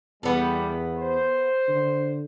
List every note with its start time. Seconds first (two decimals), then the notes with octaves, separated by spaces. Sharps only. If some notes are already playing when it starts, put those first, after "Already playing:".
0.23 E2 G3 B3 A4
0.97 C5
1.68 D3